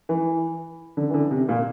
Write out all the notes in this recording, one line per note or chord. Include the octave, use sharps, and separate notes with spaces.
E3
D3
E3
D3
C3
A#2